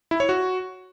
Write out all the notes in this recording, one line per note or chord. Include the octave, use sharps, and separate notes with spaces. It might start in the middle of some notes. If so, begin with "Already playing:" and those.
E4
C#5
F#4